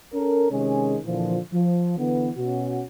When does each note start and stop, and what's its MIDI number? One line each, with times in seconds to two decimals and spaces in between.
0.14 0.51 61
0.14 0.51 69
0.14 0.51 70
0.51 0.97 48
0.51 0.97 51
0.51 0.97 56
0.51 0.97 61
0.51 0.97 68
1.06 1.39 46
1.06 1.39 50
1.06 1.39 52
1.06 1.39 53
1.53 1.96 53
1.98 2.30 50
1.98 2.30 52
1.98 2.30 59
2.38 2.83 47
2.38 2.83 61
2.38 2.83 66